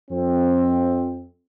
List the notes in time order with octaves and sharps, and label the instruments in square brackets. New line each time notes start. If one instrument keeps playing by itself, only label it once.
[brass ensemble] F2 C4